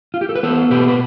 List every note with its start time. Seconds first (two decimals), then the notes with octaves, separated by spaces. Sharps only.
0.14 F4
0.21 G4
0.29 A4
0.36 B4
0.43 B3 A4 C5
0.70 B2 G4 B4
0.88 B4